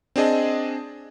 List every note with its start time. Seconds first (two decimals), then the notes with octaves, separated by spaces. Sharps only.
0.16 C4 D4 G#4 D#5 A5